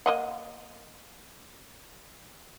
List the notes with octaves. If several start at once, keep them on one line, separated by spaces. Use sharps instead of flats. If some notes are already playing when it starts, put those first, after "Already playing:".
A#3 D#5 F#5